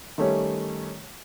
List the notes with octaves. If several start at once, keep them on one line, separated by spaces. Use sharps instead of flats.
D#3 G3 A3 C#4 G4 C#5